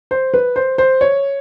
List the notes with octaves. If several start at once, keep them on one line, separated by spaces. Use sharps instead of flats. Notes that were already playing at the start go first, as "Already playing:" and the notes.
C5
B4
C5
C5
C#5